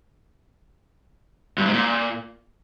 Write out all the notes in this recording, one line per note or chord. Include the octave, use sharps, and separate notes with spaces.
G2
G#2
A#2